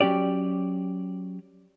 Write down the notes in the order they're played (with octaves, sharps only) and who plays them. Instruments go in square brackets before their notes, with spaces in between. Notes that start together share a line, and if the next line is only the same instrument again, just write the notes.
[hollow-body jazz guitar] F#3 C#4 G4 D5